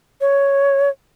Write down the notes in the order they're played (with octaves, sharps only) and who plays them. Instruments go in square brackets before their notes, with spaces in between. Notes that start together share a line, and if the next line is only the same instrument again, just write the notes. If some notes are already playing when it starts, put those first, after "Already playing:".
[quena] C#5